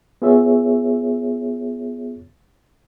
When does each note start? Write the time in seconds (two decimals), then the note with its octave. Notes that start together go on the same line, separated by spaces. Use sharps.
0.22 B3 F4 G#4 C#5 E5